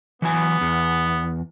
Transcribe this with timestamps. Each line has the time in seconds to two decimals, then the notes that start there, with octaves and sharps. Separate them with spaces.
0.22 E3 F#3 B3 G#5
0.61 E2